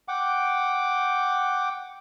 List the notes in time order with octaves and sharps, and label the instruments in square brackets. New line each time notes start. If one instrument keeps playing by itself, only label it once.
[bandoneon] F#5 G5 D6